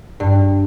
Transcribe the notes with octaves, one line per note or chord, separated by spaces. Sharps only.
G2